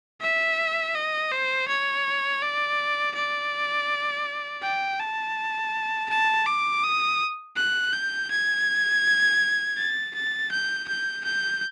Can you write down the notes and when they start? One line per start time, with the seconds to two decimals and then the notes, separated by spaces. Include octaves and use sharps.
0.21 E5
0.95 D#5
1.32 C5
1.68 C#5
2.42 D5
3.16 D5
4.63 G5
5.00 A5
6.10 A5
6.47 D6
6.84 D#6
7.57 F#6
7.93 G6
8.31 G#6
9.78 A6
10.14 A6
10.51 G6
10.88 G6
11.25 G6